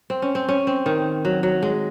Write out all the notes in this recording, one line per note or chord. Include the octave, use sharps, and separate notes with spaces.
C4
C#4
C4
C#4
C4
D#3
F#3
F#3
G#3